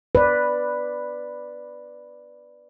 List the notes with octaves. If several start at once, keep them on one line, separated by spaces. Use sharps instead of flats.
B4 D5